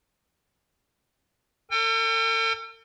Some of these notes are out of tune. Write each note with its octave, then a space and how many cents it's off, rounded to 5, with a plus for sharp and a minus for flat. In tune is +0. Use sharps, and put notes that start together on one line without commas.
A4 +45 G5 +40